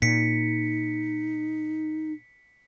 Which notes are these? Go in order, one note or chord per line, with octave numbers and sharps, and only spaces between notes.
A#2 D#4 B6 C#7